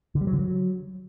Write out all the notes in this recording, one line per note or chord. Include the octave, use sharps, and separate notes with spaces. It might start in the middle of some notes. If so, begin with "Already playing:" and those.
D3
G3
F#3
D3
F#3